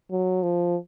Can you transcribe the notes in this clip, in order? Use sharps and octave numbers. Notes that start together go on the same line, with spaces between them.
F#3
F3